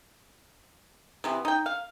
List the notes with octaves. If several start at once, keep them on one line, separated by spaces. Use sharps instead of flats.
C3 E3 B3
D#4 G5
F5